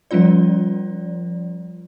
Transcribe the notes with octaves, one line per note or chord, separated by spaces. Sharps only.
F3 G3 C#4 F4 D5